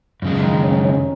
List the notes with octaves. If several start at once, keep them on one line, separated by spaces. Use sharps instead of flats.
F#2 C#3 F3 G#3
D#3 D#4
C#4
C#4